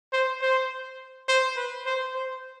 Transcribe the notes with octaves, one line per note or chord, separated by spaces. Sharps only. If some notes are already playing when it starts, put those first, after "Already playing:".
C5
C5
C5
B4
C5
C5